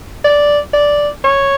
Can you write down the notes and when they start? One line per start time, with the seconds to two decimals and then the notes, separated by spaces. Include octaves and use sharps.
0.24 D5
0.73 D5
1.24 C#5